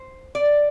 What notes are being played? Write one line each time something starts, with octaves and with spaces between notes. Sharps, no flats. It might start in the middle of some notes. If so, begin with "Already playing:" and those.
Already playing: C5
D5